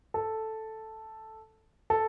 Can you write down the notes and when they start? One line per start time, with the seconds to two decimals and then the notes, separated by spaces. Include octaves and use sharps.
0.14 A4
1.90 A4